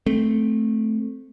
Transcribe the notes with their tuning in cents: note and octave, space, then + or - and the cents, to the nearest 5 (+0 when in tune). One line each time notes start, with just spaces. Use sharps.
A3 -5 C4 +0